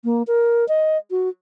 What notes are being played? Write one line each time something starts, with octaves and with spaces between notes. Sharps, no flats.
A#3
A#4
D#5
F#4